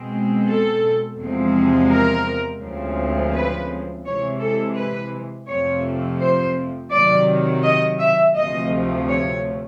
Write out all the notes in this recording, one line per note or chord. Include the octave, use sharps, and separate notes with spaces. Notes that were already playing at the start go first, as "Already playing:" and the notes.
Already playing: B2 G#3 C4
A4
E2 C3 F3 G#3 C4
A#4
D2 C#3 F3 G#3 C4
B4
C3 E3 G#3 C#5
A4
B4
F2 C3 F3 A3 C4 C#5
C5
C3 D#3 F#3 D5
D#5
E5
D2 C3 F3 A3 D#5
C#5